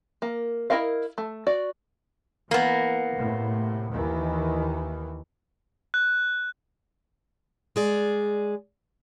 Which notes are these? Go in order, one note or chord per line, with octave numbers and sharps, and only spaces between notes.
A#3
E4 F4 A#4 D#5 F5
A3
F#4 D5
E3 A#3 B3
A2 C3
D#2 D#3 E3
F#6
G#3 G#4 D5